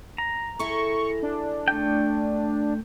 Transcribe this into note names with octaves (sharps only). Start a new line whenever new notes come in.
A#5
E4 G#4 A4 C#6
D4
A3 G5